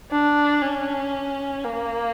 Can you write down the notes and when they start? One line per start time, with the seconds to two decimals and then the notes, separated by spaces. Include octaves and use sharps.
0.12 D4
0.62 C#4
1.64 A#3